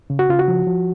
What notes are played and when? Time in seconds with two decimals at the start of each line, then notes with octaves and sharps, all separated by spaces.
0.10 C#3
0.19 F#4
0.29 C#3 F4
0.39 F#4
0.48 F3
0.67 F3